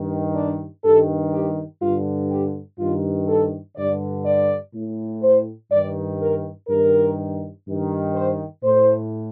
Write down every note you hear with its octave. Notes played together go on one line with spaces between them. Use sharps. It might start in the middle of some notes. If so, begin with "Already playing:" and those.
Already playing: G2 D#3
D4
G2 D#3 A4
G4
G2 D3 F4
G4
G2 D#3 F4
A4
G2 D3 D5
D5
A2
C5
G2 D#3 D5
A#4
G2 D#3 A#4
G2 D#3
C5
A2 C5